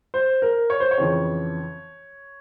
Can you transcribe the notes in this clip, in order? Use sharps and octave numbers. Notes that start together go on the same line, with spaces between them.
C5
A#4
C#5
C5
C#5
F2 C#3 E3